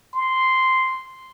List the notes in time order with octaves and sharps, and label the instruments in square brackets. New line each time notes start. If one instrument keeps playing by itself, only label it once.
[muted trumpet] C6